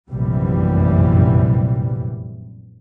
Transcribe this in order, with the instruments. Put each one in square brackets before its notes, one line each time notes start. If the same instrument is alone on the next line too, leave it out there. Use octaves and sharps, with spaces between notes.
[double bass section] F1 A#1 F#2 C3 E3 G3